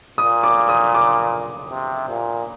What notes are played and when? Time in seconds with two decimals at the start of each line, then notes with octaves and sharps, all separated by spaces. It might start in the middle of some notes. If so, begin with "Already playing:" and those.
0.18 A#2 D#6
0.44 D6
0.69 D#6
0.95 D6
1.70 C3
2.09 A#2